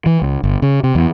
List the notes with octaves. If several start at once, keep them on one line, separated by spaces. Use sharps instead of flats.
E3
C#2
G1
C#3
C3
E2